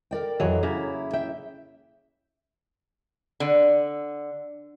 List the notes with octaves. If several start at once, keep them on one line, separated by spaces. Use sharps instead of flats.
A#4 D5 G5
F2 E3 F#3 G#4 D#5
C#3 A#3 E4
E5 G5
D3